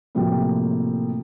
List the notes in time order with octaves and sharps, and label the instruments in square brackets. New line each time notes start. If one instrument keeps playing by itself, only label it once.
[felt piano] A2 C3 F3 F#3 A#3 C4